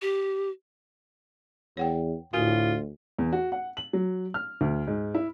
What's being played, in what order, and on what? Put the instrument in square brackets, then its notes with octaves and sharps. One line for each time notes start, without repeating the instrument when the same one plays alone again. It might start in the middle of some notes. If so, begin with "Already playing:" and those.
[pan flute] G4
[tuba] E2 [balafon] C#5 F#5 G5
[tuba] D2 [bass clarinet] A2 [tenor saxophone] F4 [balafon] F#4 A#4 G#5
[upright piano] E2
F#4
F#5
F#7
F#3
F6
D2
G#2
E4